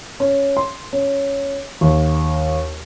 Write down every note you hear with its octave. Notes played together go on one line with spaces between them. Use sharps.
C#4
C6
C#4
D#2